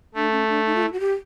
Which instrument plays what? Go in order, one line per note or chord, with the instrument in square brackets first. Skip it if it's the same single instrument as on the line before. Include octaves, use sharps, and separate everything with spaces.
[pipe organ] A3 [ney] D4
[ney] C#4
D4
D#4
F4
E4
F#4
G4